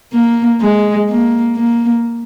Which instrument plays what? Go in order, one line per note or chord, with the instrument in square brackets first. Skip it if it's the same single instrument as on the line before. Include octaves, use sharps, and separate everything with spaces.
[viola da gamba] A#3
G#3
A#3
A#3